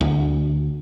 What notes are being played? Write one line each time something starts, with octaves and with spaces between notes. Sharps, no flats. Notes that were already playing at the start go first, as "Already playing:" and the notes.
D2